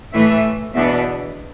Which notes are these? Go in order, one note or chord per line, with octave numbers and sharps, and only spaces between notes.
A2 E3 A3 E5
E2 B2 B3 D4 E5